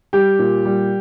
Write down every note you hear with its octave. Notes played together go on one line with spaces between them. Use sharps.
G3 G4
A#2
G3